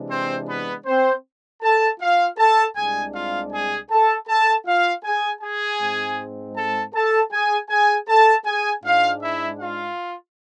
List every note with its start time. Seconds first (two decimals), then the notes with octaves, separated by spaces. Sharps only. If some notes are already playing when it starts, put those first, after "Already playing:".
Already playing: C3 E3 G#3 D4
0.11 C4 C5
0.48 B3 B4
0.86 C4 C5
1.62 A4 A5
2.00 F4 F5
2.38 A4 A5
2.76 C2 C3 G#3 D4 G#4 G#5
3.14 F4 F5
3.52 G#4 G#5
3.90 A4 A5
4.28 A4 A5
4.66 F4 F5
5.04 G#4 G#5
5.42 G#4 G#5
5.80 G#2 G#3 C4
6.56 A4 A5
6.93 A4 A5
7.31 G#4 G#5
7.70 G#4 G#5
8.08 A4 A5
8.46 G#4 G#5
8.84 G#2 G#3 D4 F4 F5
9.21 E4 E5
9.60 F4 F5